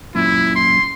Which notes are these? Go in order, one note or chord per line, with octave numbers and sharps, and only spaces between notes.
F#2 A#2 E4
C6